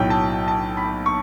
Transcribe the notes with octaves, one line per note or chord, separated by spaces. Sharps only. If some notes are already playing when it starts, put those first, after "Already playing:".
Already playing: B1 A2 F#3 G5
A5
A5
B5
C#6